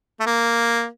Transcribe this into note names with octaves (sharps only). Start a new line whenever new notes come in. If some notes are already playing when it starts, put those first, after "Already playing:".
A3
A#3